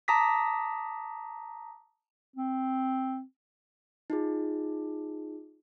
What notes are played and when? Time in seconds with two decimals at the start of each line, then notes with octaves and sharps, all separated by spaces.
0.08 A5 A#5 D6 D#6 A#6 B6
2.36 C4
4.10 D#4 F4 G#4